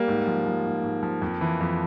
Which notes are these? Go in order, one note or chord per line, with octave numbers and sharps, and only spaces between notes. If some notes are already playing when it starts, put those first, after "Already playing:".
Already playing: G3 A#3
G#2
F3
F3
G#2
G#2
F3
F2
E3
F2